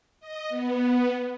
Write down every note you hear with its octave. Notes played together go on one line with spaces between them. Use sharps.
D#5
B3